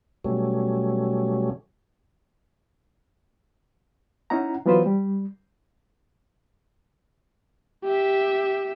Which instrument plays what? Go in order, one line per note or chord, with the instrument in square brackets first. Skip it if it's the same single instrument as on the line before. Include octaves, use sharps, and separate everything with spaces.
[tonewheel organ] B2 F#3 G3 A3 C#4
[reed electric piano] C#4 D#4 E4 F#5 A#5
E3 F#3 B3 F4 B4 C5
G3
[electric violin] G4 E5